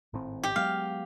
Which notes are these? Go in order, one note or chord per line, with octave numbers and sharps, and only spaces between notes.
G#1 A2 C4
G4
F#3 G#3 B3 F5